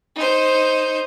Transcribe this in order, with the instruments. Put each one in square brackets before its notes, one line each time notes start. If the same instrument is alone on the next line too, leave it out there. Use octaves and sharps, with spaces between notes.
[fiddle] D#4 C5